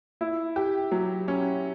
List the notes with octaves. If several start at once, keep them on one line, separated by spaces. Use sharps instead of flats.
E4
G4
F#3
C#4